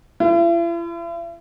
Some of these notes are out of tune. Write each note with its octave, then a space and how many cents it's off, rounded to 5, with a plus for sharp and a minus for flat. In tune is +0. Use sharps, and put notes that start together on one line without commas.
E4 +45